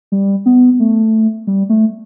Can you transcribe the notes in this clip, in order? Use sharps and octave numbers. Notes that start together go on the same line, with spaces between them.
G3
B3
A3
G3
A3